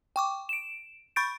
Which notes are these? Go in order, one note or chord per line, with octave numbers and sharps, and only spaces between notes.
G5 C#6 D6
D7 E7
B5 C#6 G6 A6 D7